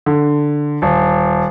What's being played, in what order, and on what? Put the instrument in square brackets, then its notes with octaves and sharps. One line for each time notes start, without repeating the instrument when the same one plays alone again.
[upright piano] D3
D#1